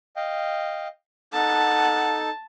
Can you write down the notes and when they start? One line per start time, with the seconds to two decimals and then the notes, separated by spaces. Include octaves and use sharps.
0.16 D#5 F5 G5
1.33 D#4 A4 F#5 A5